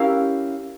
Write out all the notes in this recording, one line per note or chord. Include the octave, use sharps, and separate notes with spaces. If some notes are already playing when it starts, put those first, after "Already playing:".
Already playing: C#4 E4 G4 A#4 F5